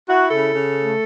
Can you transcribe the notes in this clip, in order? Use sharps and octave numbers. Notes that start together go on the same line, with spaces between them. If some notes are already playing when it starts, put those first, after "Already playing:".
E4 F#4
C#3 A4
C#3
A3